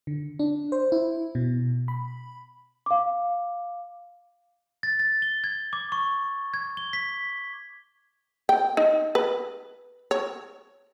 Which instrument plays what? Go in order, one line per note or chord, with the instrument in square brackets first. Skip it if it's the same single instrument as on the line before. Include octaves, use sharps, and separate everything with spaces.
[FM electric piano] D3
D4
C5
E4
B2
B5
[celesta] F5 D6
[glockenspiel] A6
A6
G7
G#6
D6
C#6
G#6
G7
B6
[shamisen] G5
D#4
B4
C#5